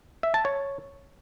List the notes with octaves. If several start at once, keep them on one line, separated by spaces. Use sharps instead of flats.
E5
A5
C#5